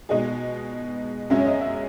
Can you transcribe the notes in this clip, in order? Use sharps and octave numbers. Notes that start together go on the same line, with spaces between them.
B2 G#3 D#4 G#4 D#5
F#2 C#3 G#3 C#4 G#4 E5
C#5
D#5
E5